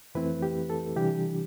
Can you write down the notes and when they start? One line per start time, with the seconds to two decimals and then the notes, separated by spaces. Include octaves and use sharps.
0.15 F2 E3 A3 C4 E4 B4
0.42 G4
0.70 A4
0.96 C3 E3 G3 D4 G4